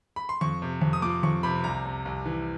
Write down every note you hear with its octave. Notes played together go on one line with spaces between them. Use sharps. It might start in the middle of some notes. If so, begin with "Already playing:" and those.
B5
C6
F2 C#6
C3
F2
D#6
F3 D6
F2 C#6
C3 B5
C2 A#5
C3
C2
E3